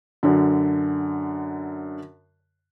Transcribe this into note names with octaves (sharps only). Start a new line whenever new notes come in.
F#2 D3